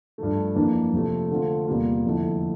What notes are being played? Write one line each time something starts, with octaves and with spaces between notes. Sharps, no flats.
G2 F3 A3
F2 E3 A#3 D4
F2 C3 F3 A3
D3 A3 C4 F4
E2 C3 G3 A#3 F4
F2 D3 A3 E4